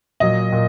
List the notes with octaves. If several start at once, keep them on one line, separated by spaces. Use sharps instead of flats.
A#2 F#3 D#5
A#2